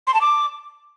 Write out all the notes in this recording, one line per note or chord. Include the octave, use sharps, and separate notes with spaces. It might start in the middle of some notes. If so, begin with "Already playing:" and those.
C6
A5
D6